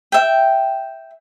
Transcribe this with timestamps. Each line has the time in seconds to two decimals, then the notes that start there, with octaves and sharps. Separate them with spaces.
0.12 E5 G5